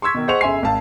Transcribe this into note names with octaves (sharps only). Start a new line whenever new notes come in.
C6 C#6 E6 G#6 B6
B2 D#3
G#4 C5 D#5 F#5 C#6 F7
G1 C#3 E5 G#5 C6 C7
G#1 F5 A5